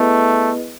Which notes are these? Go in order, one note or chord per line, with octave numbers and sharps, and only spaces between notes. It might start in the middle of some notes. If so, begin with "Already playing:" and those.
Already playing: A3 B3 E4 G#4 B4 D#5